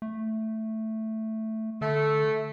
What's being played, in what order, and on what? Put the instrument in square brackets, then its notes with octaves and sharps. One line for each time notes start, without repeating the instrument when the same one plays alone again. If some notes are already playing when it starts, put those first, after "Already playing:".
[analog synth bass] A3
[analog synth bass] D3 [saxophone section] A3